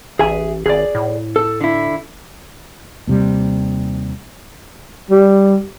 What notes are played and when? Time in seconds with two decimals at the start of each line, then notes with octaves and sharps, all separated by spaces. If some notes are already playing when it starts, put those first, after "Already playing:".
0.19 A1 G#4 E5 G#5
0.66 G#1 G#4 D5
0.95 A2
1.36 A4
1.61 D3 E4
3.07 D#2 C3 G3
5.10 G3